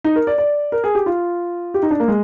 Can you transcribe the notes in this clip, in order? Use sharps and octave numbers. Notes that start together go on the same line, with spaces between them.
D#4
A#4
D5
D5
A#4
G#4
G4
F4
G4
D#4
D4
A#3
G#3